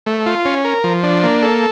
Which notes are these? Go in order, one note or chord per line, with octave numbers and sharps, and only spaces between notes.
A3
F4
C#4
A#4
F3
D4
A#3
A4